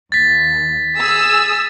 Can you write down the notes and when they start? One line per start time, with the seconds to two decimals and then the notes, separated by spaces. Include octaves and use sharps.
0.12 D#2 A6 B6
0.97 G#4 D#6 E6